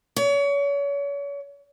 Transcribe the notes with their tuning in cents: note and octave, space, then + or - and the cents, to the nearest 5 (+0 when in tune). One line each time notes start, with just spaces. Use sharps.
C#5 +35